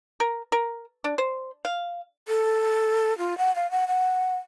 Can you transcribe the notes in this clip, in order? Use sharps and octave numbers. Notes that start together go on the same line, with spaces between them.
A#4
A#4
D4
C5
F5
A4
F4
F#5
F5
F#5
F#5